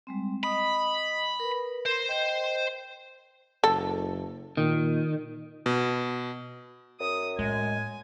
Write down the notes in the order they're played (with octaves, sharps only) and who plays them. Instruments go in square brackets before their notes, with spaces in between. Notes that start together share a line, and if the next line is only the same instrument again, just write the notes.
[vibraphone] G3 G#3 C4
[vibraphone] D#5 D#6 [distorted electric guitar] B5
[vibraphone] A#4 B4
[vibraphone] A#4 [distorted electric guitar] C5
[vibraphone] D#5 G5
[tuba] F#1 [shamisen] A4
[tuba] A#2 [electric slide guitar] D#3
[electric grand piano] B2
[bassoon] F#2 [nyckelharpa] D#6
[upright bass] A2 [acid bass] G#3 [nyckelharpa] G#5